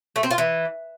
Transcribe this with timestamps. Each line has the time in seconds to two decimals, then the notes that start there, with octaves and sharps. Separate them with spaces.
0.16 A3
0.23 C4
0.31 F4
0.38 E3